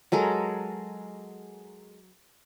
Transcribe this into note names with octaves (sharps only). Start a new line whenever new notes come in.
F#3 G#3 A4 A#4